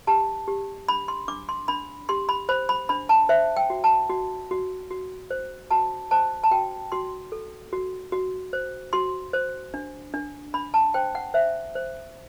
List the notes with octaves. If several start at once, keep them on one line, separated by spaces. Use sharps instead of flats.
G4 A5
G4
D4 B5
C6
D4 D6
C6
D4 B5
G4 C6
B5
C5 B5
B5
D4 B5
A5
C5 E5
G5
F#4
A5
F#4
F#4
F#4
C5
F#4 A5
C5 A5
A5
F#4 G5
F#4 C6
A4
F#4
F#4
C5
F#4 C6
C5
D4
D4
D4 B5
A5
C5 G5
F#5
C5 E5
C5